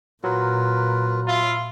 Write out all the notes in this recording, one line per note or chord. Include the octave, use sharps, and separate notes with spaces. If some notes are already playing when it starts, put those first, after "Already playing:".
A#2 F#3 F4 A#4 B4
F4 E5 B5